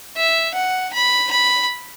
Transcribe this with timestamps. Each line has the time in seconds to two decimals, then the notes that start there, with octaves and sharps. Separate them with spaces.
0.17 E5
0.55 F#5
0.94 B5
1.31 B5